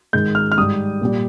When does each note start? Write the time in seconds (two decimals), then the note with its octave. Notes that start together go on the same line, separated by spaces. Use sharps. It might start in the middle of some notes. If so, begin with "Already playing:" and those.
0.13 G#2 D#3 G#3 G6
0.35 F6
0.52 F6
0.58 G#2 G3 D#6
1.01 A#2 G3